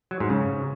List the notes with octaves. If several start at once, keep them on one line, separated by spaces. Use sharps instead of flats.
F#3
G#2
C#3